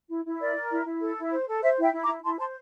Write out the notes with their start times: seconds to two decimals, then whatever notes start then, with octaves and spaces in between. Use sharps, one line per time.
0.09 E4
0.25 E4
0.40 A#4 D5
0.55 A#4
0.70 E4
0.86 E4
1.01 A4
1.17 E4
1.31 C5
1.47 A4
1.62 C5 E5
1.78 E4 E5 G5
1.93 E4
2.03 A#5 D6
2.08 E4
2.24 E4 A5 C6
2.39 C5 A5 C6